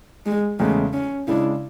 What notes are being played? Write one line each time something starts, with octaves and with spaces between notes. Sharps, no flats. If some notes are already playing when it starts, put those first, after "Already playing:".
G#3
E2 C#3 G#3 A3 C#4
C#4
C#3 G#3 D4 E4